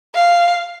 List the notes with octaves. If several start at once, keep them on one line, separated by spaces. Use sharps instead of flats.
F5